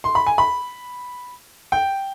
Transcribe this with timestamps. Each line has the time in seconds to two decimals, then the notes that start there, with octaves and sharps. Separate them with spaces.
0.04 C6
0.15 B5
0.27 G#5
0.38 B5
1.72 G5